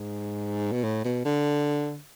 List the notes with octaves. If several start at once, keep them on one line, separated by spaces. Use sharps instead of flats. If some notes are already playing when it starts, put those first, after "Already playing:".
Already playing: G#2
B2
A2
B2
D3